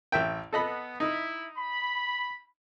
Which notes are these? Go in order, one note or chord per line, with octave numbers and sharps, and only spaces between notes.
A1 E5 G5
B3 A4 D#5 B5
D#4 E4
B5